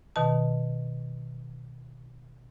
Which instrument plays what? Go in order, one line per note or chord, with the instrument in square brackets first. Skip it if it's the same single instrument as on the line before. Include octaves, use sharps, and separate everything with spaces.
[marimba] B2 D#3 A5